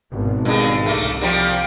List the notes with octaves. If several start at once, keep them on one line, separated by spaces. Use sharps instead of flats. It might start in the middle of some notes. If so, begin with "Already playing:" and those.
G#1 B2
G2 G#3
C2 A3 A#3
F3 G3 A#3